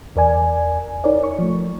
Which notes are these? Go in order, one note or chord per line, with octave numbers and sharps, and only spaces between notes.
E2 A#4 D5 G#5
D#4 A#4 C#5 D5
C#6
F3 A3